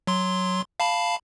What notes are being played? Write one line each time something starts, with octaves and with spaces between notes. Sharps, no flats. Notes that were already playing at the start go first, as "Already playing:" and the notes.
F#3 C6
F5 A5 B5